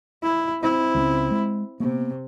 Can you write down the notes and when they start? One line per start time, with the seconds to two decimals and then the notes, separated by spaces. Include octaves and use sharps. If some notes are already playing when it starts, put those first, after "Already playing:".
0.23 E4
0.62 C4 E4
0.95 C#2 F#3 C#4
1.31 G#3
1.80 C3 A#3 B3